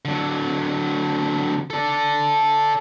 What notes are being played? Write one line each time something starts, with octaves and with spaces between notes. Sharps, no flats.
D3 F#3
A4 D5